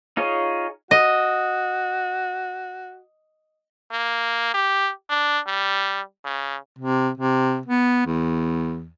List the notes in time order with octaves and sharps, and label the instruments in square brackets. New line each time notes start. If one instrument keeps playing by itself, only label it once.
[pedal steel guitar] D#4 F4 G#4 C#5 D#5
[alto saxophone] F#4 [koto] D#5
[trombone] A#3
G4
D4
G3
C#3
[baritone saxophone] C3
C3
B3
E2